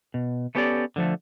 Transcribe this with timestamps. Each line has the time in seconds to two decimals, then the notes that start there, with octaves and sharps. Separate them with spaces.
0.14 B2
0.55 A3 B3 C#4 G4 A4 D5
0.96 D3 F3 A3